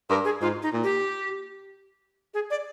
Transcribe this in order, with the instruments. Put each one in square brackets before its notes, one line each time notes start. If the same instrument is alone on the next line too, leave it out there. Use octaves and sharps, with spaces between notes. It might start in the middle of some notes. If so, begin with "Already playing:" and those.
[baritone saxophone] G2 [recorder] A#4
[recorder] G#4
[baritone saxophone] G#2 [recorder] F4
[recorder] D#4
[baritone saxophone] A#2
[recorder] G4
G#4
D5